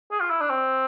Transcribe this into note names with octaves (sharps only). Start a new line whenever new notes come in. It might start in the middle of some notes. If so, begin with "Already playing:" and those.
G#4
F4
E4
D4
C4